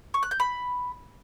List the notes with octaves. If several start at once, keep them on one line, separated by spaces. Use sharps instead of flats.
C#6
F#6
G6
B5